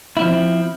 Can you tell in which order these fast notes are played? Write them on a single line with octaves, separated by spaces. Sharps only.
E4 F3 C4